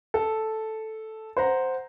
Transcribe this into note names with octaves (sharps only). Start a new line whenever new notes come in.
A4
C5 F#5 A#5